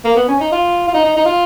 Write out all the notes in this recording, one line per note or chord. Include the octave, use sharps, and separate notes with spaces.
A#3
B3
C#4
D#4
F4
F4
D#4
D#4
D#4
F4